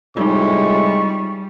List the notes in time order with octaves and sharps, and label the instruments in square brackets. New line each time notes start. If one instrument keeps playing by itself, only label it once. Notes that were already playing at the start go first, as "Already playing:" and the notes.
[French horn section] A2 C3 G#3 [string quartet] G3 [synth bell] D#4 F4 [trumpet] C#6